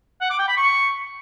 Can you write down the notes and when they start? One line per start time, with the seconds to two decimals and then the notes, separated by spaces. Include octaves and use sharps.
0.21 F#5
0.30 D6
0.39 G5
0.48 B5
0.57 C#6